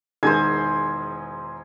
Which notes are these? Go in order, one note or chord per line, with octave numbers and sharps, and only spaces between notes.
E1 D#3 G#4 C5 G#5